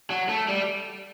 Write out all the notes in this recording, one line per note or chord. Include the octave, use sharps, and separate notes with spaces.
F#3
A3
G3